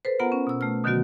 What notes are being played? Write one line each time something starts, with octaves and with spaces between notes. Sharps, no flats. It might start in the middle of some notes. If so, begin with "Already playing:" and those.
A4 B4 C5
B3 F4 A#4 F#5 A#5
C#4
B2 E6
A3 F6
B2 D3 D#3 F#3 B3 F#4